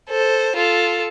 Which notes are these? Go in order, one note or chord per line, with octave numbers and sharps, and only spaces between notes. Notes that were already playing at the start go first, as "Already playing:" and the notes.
A4 C5
F4 A4